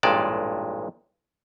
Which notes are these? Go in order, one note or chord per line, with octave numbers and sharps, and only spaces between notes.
A1 G2 A#2 G#3 D5 A5